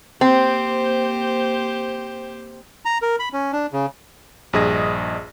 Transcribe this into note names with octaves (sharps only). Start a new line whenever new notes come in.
A#3 C4 G4 C5
A#5
A#4
B5
C#4
D4
C#3
A#1 G2 G#4 D#5 D#6 A#6